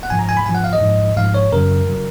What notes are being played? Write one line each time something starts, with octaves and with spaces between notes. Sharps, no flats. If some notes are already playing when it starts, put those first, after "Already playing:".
F#5
G#2 F3 G#5
A#5
G#5
B5
G#2 F3 G#5
F#5
F5
D#5
G#2 F3
G#2 F3 F5
C#5
F#2 C#3 F#3 A#4
C#3 F#3